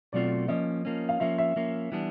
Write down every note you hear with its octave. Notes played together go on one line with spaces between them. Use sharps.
B2 F#3 A3 C4 F4 D5
F3 A#3 C#4 D#5
F3 A#3 C#4
F5
F3 A#3 C#4 E5
E5
F3 A#3 C#4
E3 G3 B3 D4